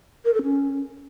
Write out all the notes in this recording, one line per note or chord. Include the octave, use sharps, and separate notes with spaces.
A#4
A4
C#4